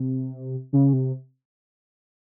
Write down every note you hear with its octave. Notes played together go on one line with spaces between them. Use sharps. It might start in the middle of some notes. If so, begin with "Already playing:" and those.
Already playing: C3
C#3
C3